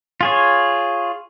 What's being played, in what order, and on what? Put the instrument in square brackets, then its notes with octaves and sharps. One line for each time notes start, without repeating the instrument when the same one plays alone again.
[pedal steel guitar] F4 G#4 C#5